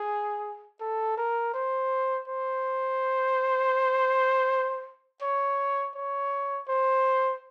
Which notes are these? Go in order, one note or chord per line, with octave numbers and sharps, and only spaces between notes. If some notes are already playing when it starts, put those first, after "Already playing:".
Already playing: G#4
A4
A#4
C5
C5
C#5
C#5
C5